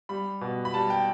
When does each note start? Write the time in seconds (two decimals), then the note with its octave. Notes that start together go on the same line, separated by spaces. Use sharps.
0.09 G3 B5
0.41 B2
0.65 B5
0.74 G3 A5
0.90 G5